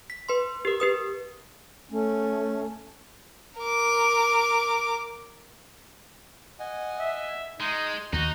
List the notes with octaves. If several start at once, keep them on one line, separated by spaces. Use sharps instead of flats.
B6
B4 C6
G4 A#4
G4 B4 D#6
A3 C#4
A#4 D6
D#5 F#5 G#5
E5
G#3 D#4 C6
D#2 D#4 F#4